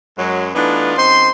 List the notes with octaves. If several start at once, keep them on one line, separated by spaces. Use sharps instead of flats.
F#2 F#3 G#3
E3 A3 B3 D4 D#4 F4
F#2 C4 D#4 C5 C6